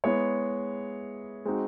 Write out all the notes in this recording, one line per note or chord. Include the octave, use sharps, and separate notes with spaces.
G#3 B3 E4 G#4 C#5
G#3 C4 D#4 F#4